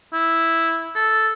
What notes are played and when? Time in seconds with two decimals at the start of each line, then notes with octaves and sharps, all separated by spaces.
0.13 E4
0.95 A4